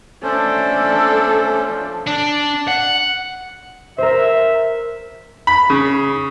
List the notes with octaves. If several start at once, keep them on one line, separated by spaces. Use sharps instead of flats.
A3 C#4 D4 A4 C5
F3
D4
F#5
A#4 C5 E5
B5
C#3